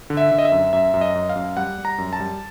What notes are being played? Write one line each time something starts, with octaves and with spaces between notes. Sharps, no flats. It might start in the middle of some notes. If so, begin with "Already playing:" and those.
D3
E5
D3
D#5
E5
F#2
F#2 E5
F#2
D#5
F#2
F5
F#2
G3 F#5
G3
A#5
F#2
A5
G3